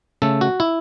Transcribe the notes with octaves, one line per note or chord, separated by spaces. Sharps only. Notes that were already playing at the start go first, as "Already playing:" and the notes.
C#3 A3 A4
F#4
E4